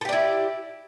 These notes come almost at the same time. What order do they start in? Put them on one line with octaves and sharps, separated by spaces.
A4 G4 D5 E4